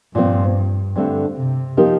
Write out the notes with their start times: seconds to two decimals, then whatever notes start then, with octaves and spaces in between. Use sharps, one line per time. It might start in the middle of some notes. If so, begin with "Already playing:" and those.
0.15 G2 A#2 F3 C4
0.96 G2 D3 A3 C4
1.37 C3
1.77 F3 A#3 D#4 G4 A#4